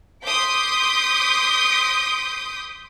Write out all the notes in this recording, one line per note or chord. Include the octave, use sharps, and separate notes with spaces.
C6 D6 D#6 G6 B6